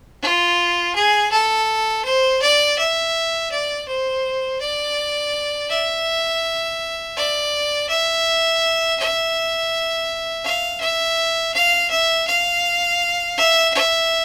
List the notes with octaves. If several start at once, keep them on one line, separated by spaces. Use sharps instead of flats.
F4
G#4
A4
C5
D5
E5
D5
C5
D5
E5
D5
E5
E5
F5
E5
F5
E5
F5
E5
E5